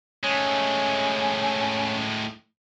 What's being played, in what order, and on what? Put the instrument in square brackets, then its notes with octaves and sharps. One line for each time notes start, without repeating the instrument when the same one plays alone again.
[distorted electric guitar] A2 G#3 [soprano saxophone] C#4